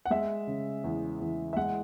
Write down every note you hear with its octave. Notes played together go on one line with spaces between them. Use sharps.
F#5
G#3 E5
C#3
E2
E2
E5
G#3 F#5